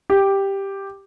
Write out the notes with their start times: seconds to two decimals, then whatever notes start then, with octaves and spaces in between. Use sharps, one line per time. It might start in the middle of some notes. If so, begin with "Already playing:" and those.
0.10 G4